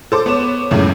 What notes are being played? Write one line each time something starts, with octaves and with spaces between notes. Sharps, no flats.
A4 C5 D6
B3 C#5 E7
C#2 F#2 A2 C#3